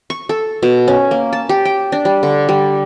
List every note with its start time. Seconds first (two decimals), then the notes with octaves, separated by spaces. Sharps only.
0.10 C#6
0.29 A4
0.63 B2
0.88 C#4
1.11 A#3
1.33 A5
1.49 G4
1.65 G5
1.92 D4
2.05 G3
2.23 D3
2.49 G3